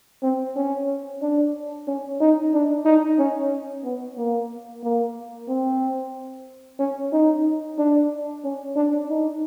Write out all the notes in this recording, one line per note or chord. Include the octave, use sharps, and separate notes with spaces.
C4
C#4
D4
C#4
D#4
D4
D#4
C#4
B3
A#3
A#3
C4
C#4
D#4
D4
C#4
D4
D#4